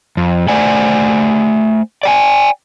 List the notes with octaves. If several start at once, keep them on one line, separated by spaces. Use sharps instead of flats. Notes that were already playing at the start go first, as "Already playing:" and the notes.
F2
A3 C5 D5 F#5 G#5
D5 G5 G#5